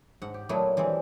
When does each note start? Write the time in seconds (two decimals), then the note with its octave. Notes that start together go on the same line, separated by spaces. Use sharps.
0.22 G#2 F#5
0.34 G4
0.49 A#2 F#3 A3 B3 E4 D5
0.77 E3 G3 G#3 C4